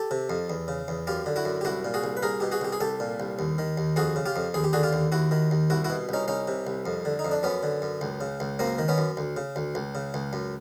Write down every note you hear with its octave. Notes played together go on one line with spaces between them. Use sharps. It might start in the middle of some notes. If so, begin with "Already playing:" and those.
Already playing: G4 A4
C3
F2
E2
C#3
E2
F#2 F4 G4
D3
E4 F#4
F#2
G4
C2 E4 F#4
A#2
F#4 G#4
C2
B4
C2 G#4 A#4
B2 G4
F#4 G#4
C2 G4
G#4
C2 G4 A4
A#2
C2
D#2
D#3
D#2
F2 F#4 G#4
C#3
F4 G4
F2
D#2 G#4
G4
D3 F#4 G#4
F4 G4
D#2
D#2 E4 F#4
D#3
D#2
C2 E4 F#4
E4 F#4
B2
C2 C#4 D#4
C2 C#4 D#4
C3
C2
F2
D3
D#4
F2
D4
F#2 B3 C#4
D3
F#2
C#2
C#3
C#2
F#2 A#3 C4
D#3
B3 C#4
F#2
D2
C#3
D2
C#2
C#3
C#2
F#2